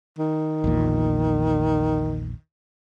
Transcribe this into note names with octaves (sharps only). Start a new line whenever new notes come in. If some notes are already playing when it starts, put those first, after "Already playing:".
D#3
A#1 E2 A#2